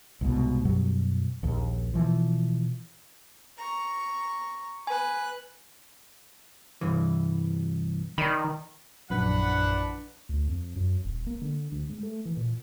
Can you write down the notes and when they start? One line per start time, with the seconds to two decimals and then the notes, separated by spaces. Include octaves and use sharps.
0.21 C2 G#2 B2
0.65 F#2 B2 F#3 G3
1.43 A#1 D#2
1.94 B2 E3 F3
3.58 A#5 C#6
4.87 B4 G#5 F#6
6.81 C2 G2 E3
8.18 D#3 D5 B5
9.10 A#1 F#2 E3 F3 D4 B4 F#5
10.29 D2
10.48 F2
10.76 F#2
11.05 D#1
11.27 A#3
11.42 D3
11.72 D2
11.89 G#2
12.03 A3
12.26 E3
12.37 A#2